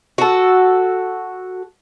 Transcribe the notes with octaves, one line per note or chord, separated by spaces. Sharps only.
F#4 A4